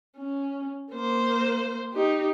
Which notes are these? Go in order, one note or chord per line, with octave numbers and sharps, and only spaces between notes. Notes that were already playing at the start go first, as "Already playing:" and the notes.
C#4
A#3 C5
D#4 G4